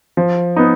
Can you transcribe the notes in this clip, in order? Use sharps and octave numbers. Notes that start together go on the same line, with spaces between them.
F3
B3 D#4